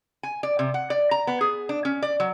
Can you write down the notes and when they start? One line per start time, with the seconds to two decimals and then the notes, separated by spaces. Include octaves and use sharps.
0.23 G#5
0.43 D5
0.59 C3
0.74 F#5
0.90 D5
1.11 A#5
1.27 B3
1.41 G#4
1.69 D4
1.85 C#4
2.02 D5
2.20 F#3